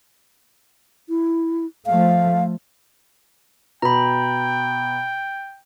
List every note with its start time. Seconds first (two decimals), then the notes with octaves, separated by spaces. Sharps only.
1.09 E4
1.86 F3 A3 F5
3.82 B2 G5 A#5 B5